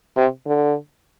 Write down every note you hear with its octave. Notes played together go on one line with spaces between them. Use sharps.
C3
D3